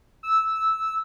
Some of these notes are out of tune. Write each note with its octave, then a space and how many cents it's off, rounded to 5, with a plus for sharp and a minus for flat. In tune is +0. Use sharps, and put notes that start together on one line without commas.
E6 -10